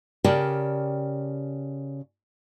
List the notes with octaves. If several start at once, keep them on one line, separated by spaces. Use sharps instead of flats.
C#3 G4 A#4 D5 G5 A5